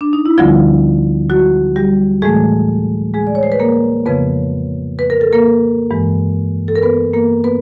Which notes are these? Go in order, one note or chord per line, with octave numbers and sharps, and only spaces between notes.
D4
D#4
E4
D2 D3 F3 G3 B3 F4
F#3 F#4
G3 G4
A2 E3 G#3 A3 G#4
G#3 G#4
D5
C#5
C5
B4
A#3 A#4
F2 C#3 F3 B3 B4
B4
A#4
A4
A#3 A#4
G2 E3 G#3
A4
A#4
B3 B4
A#3 A#4
B3 B4